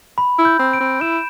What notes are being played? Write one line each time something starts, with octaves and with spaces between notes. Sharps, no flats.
B5
E4
G6
C4
D7
C4
E4 E7